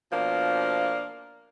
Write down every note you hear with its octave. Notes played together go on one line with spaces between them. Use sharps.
B2 F3 A#3 D4